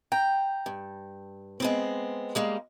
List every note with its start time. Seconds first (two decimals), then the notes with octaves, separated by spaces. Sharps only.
0.12 G5 A#5
0.66 G2
1.60 G#3 B3 C4
2.35 G3 G#3 A#3